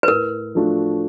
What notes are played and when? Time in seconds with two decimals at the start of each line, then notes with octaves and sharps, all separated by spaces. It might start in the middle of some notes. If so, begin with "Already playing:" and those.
0.03 B4
0.08 A2 A#4
0.55 F3 A3 D4 F#4